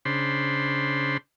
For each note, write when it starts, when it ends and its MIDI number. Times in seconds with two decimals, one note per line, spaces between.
0.05 1.17 49
0.05 1.17 62
0.05 1.17 72
0.05 1.17 83
0.05 1.17 84